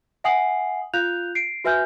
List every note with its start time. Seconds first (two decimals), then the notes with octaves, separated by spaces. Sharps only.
0.24 E5 F#5 G#5 D#6 C7 F#7
0.94 F4 F5 F#6 G6 F7
1.35 C7 D7
1.65 F#4 B4 E5 G#5 F6 G6